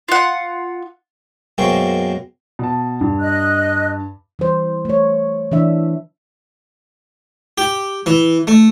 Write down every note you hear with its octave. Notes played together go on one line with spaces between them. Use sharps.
F4 F#5
F#2 B2 G#3 A#3 C5 G5
B2 A5
G2
D#5 F#6
E3 G3 C5
A3 C#5
E3 D4 E5
G4
E3
A3